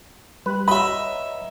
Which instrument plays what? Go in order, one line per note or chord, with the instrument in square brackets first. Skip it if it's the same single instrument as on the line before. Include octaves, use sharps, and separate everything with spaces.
[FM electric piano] G3 G4 F#6 [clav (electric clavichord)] B4
[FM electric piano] C#5 F#5 A#5 [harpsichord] D#5 E5 [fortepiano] B5